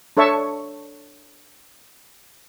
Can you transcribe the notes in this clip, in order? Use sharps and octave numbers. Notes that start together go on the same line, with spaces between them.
D4 A4 C#5 E5 A5 C#6